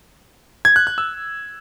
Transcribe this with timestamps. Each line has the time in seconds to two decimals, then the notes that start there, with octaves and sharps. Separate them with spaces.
0.65 G#6
0.76 F#6
0.87 F#6
0.98 E6